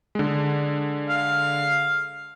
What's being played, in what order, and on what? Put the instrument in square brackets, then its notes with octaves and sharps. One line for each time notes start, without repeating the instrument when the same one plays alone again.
[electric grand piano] D3 G#3
[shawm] F5